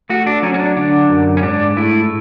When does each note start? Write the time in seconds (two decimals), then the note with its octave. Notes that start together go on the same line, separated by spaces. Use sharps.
0.10 A3 F#4
0.26 D4
0.43 F#3 C#4
0.54 C#4
0.59 D4
0.77 D3 D4
1.09 F#2
1.37 C#4
1.43 G#2 D4
1.77 A3 E4